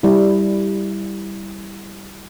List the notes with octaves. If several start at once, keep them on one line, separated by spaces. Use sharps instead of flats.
G3 E4